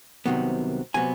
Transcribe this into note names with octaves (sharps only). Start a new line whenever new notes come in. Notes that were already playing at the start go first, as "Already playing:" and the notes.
C2 C3 D#3 F#3 B3
C3 F#3 B3 G#5